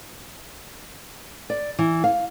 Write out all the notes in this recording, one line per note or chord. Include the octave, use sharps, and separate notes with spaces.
D5
E3
F5